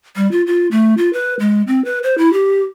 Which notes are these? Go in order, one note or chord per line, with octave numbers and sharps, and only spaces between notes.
G3
F4
F4
A3
F4
B4
G#3
C4
B4
C5
E4
G4